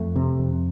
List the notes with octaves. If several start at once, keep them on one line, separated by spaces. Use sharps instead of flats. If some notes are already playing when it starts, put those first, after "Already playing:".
Already playing: F2 A3
C3
F2